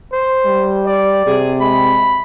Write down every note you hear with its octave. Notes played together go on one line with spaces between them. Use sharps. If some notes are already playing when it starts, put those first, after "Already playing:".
C5
G3
D5
C3 G#4
G#3 B5